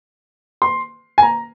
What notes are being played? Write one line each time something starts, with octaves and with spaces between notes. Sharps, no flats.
C6
G#5
A#5